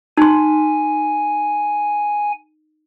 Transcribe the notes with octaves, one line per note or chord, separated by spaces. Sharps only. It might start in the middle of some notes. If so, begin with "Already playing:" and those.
D#4 G#5 C6